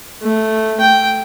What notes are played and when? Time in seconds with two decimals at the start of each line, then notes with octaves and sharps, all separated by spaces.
0.22 A3
0.80 G5